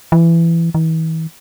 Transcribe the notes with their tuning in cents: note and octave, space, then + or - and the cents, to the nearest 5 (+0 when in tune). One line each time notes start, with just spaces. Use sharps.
E3 +20
E3 -40